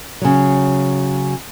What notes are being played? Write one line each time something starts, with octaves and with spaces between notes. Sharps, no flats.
C#3 F#3